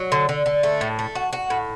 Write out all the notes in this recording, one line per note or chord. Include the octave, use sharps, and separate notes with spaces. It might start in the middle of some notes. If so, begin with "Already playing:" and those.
Already playing: F#3
D3
D3
D3
A3
A2
A3
F#4
F#4
A2